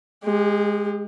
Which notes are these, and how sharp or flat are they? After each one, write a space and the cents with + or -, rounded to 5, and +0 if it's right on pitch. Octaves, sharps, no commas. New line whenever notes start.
G#3 +0 G4 +35